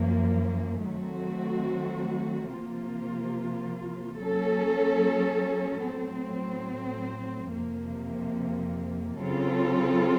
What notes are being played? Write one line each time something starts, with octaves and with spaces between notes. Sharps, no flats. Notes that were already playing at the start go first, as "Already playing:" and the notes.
Already playing: F#2 F3 A#3
D#3 F#3 A3 C4 F#4
C3 F3 A#3 F4
F#3 A#3 C#4 A4
A2 F#3 C4
F2 C3 F3 A#3
C#3 F#3 C4 F4 A4